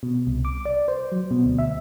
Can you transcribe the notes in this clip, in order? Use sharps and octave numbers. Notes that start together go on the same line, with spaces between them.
B2
C2
D6
D5
C5
F#3
B2
D2
E5